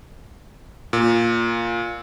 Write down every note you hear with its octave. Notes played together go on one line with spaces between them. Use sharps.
A#2